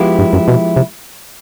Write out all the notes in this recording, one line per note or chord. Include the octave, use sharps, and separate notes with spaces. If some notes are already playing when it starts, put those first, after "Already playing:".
Already playing: F3 G#3 B3 E4 G4
G2
F#2
B2
C3